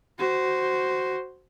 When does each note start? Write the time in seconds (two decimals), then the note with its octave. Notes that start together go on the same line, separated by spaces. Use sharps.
0.19 F#4 C5